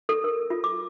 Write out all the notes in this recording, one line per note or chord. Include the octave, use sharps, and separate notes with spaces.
A4
A#4
F4
D6